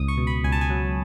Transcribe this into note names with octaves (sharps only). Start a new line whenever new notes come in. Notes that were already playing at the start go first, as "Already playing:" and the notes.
Already playing: C#2 D#6
C#6
B2
B5
C#2 G#5
A5
G#5
F#3